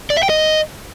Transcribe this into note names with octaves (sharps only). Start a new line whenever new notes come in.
D5
E5
G5
D#5